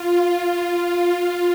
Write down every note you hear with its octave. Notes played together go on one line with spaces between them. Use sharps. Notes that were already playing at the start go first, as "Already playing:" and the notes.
Already playing: F4
F4